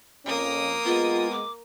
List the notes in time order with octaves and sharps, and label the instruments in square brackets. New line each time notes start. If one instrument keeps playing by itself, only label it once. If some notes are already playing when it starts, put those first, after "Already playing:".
[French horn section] F2 C#4 [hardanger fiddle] A#3 D#6
[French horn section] G#3 B3 [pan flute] F4
[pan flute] D6